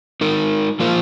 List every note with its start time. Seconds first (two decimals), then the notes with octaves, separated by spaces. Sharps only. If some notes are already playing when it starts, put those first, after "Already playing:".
0.21 G#3 D#4 A#4
0.80 F3 A#3 F4 C5